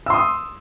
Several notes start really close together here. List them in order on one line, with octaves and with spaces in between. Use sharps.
E6 C6 D#6